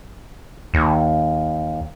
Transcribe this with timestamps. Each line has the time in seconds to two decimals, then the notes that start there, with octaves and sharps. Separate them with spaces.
0.74 D#2